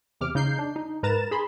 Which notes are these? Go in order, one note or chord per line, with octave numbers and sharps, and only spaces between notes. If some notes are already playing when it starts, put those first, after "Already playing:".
E2 C3 D6 F6
C#3 D#4 G6 C7
D4
D#4
G#2 A#4 B4 A#5 A6 E7
G#4 B5 C6